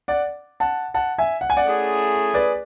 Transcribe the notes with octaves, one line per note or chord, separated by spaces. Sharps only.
D5 F#5
F#5 A5
F#5 A5
E5 G#5
F#5
G#5
D5 F#5
A3 C#4 E4 G#4
B4 D5